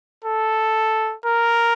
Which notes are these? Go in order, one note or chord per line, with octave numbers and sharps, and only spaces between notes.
A4
A#4